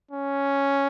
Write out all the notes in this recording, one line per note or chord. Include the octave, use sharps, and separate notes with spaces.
C#4